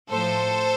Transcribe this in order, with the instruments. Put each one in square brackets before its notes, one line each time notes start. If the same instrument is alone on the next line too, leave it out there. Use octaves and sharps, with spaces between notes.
[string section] A2 F3 A4 C5